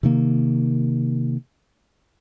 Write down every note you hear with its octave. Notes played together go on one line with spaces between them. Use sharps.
C3 D#3 A#3